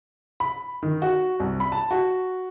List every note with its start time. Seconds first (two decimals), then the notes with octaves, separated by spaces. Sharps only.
0.40 B5
0.82 D#3
1.02 F#4
1.40 C2
1.60 B5
1.72 A5
1.91 F#4